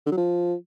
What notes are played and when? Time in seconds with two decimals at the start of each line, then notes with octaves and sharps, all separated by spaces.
0.06 D3
0.12 F#3
0.17 F3